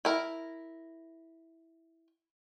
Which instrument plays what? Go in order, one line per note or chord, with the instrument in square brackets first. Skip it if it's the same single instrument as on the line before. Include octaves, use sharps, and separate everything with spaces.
[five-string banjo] E4 A#4